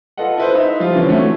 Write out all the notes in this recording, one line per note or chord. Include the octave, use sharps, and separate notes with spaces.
F4 A4 B4 D#5 F#5
E4 B4 C5
D#4 E5
F3 G3 F4
D3 E3 C4 C#4
E3 F#3 A3 C#4 F#4